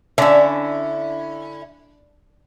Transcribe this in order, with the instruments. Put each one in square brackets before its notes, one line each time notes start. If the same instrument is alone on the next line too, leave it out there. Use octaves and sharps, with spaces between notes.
[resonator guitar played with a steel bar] D3 C#4 [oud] D4 [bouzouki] E4 E5